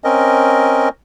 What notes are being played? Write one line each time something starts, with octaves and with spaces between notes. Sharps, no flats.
C4 C#4 A#4 D#5